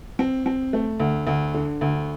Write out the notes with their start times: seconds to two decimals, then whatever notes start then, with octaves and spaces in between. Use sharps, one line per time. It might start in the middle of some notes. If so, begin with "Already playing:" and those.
0.19 C4
0.46 C4
0.73 A3
1.00 D2
1.27 D2
1.54 D3
1.81 D2